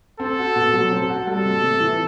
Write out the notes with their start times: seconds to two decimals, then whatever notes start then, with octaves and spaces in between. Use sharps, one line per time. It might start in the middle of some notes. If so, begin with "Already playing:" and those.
0.20 C4 A4
0.38 F#4
0.56 B2
0.73 F#3
0.91 C4
1.09 F#4
1.27 G3 A4
1.45 C3
1.63 C3
1.80 E3